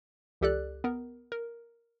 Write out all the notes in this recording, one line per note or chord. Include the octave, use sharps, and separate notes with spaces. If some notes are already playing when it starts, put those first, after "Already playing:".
C#2 E3 G4 A4 D5 F#6
B3 A#4
A#4